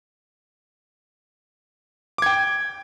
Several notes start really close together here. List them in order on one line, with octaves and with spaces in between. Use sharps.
D6 G#6 G5